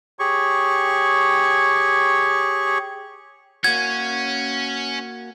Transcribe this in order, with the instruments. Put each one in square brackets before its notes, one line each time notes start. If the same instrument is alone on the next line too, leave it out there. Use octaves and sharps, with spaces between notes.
[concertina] G4 G#4 C#5 C#6
[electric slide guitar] A#3 F#4 [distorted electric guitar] C#4 [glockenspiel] G#6